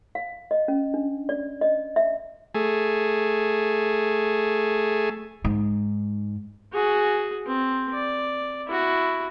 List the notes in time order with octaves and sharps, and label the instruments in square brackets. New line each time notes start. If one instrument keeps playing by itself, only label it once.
[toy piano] F5
D#5
C#4
D4
D5
D#5
E5
[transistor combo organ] A3 G#4
[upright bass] G#2
[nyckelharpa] F#4 G#4
C4
D5
E4 F#4